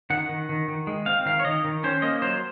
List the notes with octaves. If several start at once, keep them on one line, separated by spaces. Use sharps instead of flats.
D#3 F#5
D#3
D#3
D#3
G#3
C4 F5
D#3 F5
C#5
D#3 D#5
D#3
C#4 C5
A#3 D#5
F#3 C5